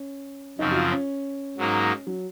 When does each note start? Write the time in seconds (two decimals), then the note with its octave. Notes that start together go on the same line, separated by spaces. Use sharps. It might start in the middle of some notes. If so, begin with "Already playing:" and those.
Already playing: C#4
0.58 F#2 C#3 F3 C4 D#4
0.71 F#4
0.75 F4
0.91 C#4
1.57 G#2 F#3 A#3 D#4
2.07 F#3